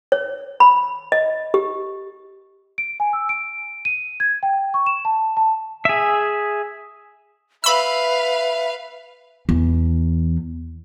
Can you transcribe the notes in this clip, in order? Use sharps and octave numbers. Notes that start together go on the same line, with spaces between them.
C#5
B5
D#5
G4
D7
G#5
E6
D7
D#7
G#6
G5
C#6
E7
A5
A5
G#4 E5
B4 E5 F5 B5 E6
E2